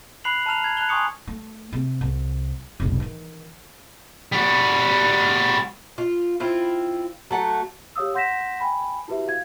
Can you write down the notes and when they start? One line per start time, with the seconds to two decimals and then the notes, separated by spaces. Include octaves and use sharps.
0.24 B5 F#6 C7 F7 F#7
0.46 A5 A#5 F6 F7
0.64 G#6
0.77 A5 F#6 F7 G7
0.89 G#5 C6 C#6 D#6 C#7
1.27 A3
1.73 C3
2.01 C2
2.80 F1 B1
3.00 D#3 E3
4.32 G3 F#4
5.98 F4
6.40 C4 E4 F4
7.31 F#3 A3 F#5
7.96 G4 C#5 F5 D#6 E6
8.14 F#5 C6 G6 A#6 B6 E7
8.60 G5 G#5 B5
9.08 E4 F#4 G4 B4 E5
9.28 F5 G#6